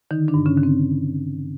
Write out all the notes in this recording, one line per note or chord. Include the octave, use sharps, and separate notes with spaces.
D3 D#3 D#4
D3 D4
G2
C#3 C#4
D3
C4